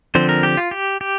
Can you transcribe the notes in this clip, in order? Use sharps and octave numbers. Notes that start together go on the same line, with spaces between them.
D3 F3 C4 C5
A#4
G4
F4
G4
G4